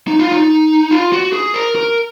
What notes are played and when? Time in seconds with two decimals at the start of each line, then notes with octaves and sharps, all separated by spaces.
0.08 D#4
0.19 F4
0.32 D#4
0.91 F4
1.13 F#4
1.33 G#4
1.54 A#4
1.75 A#4